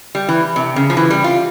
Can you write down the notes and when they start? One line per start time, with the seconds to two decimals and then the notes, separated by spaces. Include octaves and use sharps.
0.15 G3
0.29 E3
0.56 C3
0.76 C#3
0.90 F3
0.97 E3
1.11 G3
1.24 F4